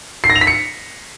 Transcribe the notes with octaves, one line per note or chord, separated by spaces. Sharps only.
C7
A#6
F7
B6
C#7